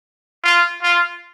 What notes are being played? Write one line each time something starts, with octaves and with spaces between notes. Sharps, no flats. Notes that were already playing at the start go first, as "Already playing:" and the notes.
F4
F4